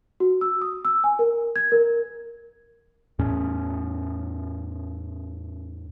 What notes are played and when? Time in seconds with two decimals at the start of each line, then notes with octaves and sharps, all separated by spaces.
0.20 F#4
0.41 E6
0.62 D#6
0.85 E6
1.04 G#5
1.19 A#4
1.56 G#6
1.72 A#4
3.19 E2 A2 C#4